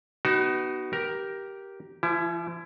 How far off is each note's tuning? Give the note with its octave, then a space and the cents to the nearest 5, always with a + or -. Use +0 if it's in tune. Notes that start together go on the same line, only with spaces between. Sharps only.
B3 +0 D#4 -10 F#4 +30
G4 -10 A#4 +10
F3 -40 E4 +15